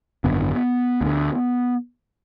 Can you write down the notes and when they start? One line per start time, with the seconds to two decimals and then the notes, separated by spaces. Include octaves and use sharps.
0.24 G#1 F#2 D3 B3
1.01 D2 D3